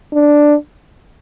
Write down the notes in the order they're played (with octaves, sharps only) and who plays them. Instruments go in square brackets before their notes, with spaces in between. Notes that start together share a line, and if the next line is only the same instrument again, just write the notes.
[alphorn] D4